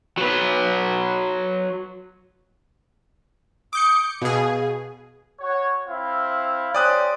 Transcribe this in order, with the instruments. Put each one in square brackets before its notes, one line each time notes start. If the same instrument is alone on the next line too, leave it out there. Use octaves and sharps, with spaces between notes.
[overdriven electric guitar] F#3 B4
[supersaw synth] D6 G6 C#7 [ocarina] D#6
[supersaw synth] B2 G#4 [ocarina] F5
[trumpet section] F#4 C#5
C4 E4 F5
[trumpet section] C#4 G4 C5 [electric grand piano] D5 D#6 F#6